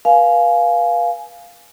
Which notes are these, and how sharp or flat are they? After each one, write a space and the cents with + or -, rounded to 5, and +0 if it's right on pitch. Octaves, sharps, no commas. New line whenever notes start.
B4 -35 F5 +0 G#5 +20